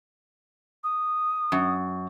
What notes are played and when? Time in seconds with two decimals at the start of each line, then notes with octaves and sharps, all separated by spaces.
0.83 D#6
1.52 F#2